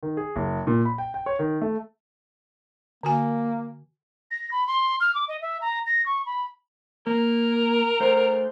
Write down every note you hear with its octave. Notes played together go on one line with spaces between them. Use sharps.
D#3
G#4
F#1
A#2
B5
G5
G5
C#5
D#3
A3
D3 A#3 F#4 G#5
A#6
B5
C6
F6
D6
D#5
E5
A#5
A#6
C#6
B5
A#3 A#4
A3 C5